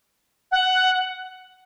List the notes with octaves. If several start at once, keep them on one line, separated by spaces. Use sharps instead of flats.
F#5